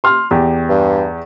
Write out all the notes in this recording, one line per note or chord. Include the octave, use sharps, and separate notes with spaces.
C6 F6
E2 G4
G2